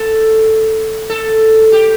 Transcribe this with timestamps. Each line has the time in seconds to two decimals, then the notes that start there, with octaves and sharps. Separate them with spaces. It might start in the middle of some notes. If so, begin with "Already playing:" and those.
Already playing: A4
1.10 A4
1.72 G4